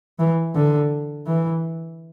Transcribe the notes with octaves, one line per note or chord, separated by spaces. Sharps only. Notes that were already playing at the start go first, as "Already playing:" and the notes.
E3
D3
E3